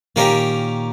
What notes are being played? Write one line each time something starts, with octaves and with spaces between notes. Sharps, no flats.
A#2 D#3 A#3 C#4 G4 A#4